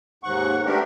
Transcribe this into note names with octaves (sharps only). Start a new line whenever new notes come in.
D#2 G#2 F#5 C#6
A3 B3 D4 G4 A#4